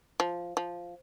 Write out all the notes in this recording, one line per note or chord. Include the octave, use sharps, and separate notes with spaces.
F3
F3